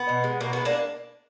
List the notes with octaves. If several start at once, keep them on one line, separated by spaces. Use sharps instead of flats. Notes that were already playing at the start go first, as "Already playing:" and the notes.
Already playing: B3
B2
G#3
B2 A#3
G#3 B3
A#3 D4